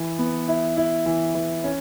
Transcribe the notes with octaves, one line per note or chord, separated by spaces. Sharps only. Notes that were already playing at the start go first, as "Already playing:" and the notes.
Already playing: E3
B3
E4
E4
E3
E3
C#4